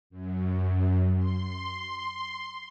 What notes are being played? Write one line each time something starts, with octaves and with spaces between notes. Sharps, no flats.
F#2
C6